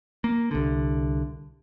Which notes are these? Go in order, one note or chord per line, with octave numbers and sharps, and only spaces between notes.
A#3
C2 D3